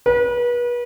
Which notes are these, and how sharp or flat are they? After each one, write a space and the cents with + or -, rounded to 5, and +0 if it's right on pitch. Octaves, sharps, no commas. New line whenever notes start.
B4 -35